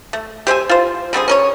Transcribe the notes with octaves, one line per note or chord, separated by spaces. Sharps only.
A3
G4 C5 E5 G#5
F4 C5
D3 G3 C4 G#4
C#4 A#4 C#5